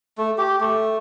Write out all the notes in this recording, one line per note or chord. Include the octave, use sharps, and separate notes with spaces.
A3
G4
A3